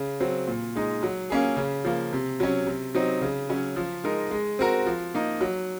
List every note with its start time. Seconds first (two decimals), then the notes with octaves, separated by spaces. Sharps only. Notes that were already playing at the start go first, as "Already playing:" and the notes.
Already playing: C#3
0.20 F#3 C4
0.47 A#2
0.75 G#3 D#4
1.03 F#3
1.30 A#3 C#4 G#4
1.57 C#3
1.85 F3 A#3
2.13 C3
2.40 F#3 C#4
2.67 C3
2.95 F#3 C4 D#4
3.21 C#3
3.49 F#3 C#4
3.76 F3
4.04 G#3 D#4 A#4
4.31 G#3
4.59 C4 F#4 A#4
4.86 F3
5.14 A#3 D#4
5.41 F#3